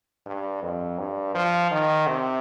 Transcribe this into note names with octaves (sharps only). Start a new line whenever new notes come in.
G2
F2
G2
F3
D#3
C3